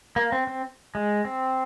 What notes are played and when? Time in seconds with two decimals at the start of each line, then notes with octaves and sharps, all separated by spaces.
0.16 A#3
0.32 C4
0.47 C4
0.95 G#3
1.25 C4